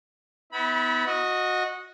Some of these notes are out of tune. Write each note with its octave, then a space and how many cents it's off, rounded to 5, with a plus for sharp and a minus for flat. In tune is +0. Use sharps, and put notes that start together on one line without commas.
B3 +20 E4 -35 B5 -20
F#4 -15 D#5 +0